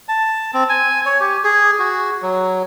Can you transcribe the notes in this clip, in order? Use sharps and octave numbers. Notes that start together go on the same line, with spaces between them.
A5
C4
G#5
C#5
G4
G#4
F#4
F#3